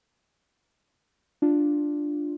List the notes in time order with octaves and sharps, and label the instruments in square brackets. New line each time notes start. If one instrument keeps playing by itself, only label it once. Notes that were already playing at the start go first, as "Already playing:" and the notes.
[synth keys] D4 F4